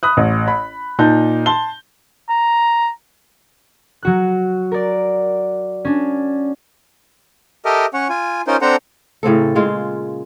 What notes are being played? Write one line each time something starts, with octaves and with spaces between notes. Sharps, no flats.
B5 D#6 F#6
A1
B5
A#2 D#4 A5 G6
A5 C6 G7
A#5
F#3 F#4 F#6
A#4 D5
C#4 D4
G4 A4 A#4 D#5 E5
C#4 C#5 F#5
F4 G#5
C#4 D#4 F4 A#4 C5
C4 D4 A4 C5 F#5 A#5
A2 C#3 C4 A4
A#2 C#3 G#3 F4